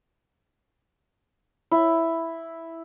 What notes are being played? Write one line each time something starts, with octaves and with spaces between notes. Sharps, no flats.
E4